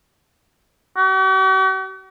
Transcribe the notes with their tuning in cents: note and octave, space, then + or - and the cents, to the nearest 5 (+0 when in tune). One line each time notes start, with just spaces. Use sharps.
F#4 +45